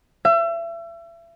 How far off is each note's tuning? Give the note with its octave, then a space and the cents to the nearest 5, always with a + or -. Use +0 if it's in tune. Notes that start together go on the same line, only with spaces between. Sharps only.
E5 +35